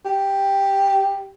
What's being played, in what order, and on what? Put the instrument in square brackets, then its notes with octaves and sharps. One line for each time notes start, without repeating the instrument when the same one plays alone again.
[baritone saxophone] G4